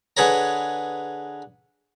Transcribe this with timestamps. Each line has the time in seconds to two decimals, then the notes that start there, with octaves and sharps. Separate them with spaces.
0.17 D3 G#4 B4 C#5 A#5